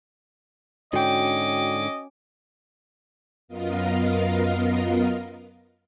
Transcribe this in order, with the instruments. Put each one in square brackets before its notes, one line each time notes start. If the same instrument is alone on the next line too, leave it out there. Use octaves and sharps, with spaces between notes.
[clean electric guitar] G#2 D3 [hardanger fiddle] C#4 D6 [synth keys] F#4 G5 [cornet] D#5
[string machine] F#2 B3 F4 A#4 D#5 F5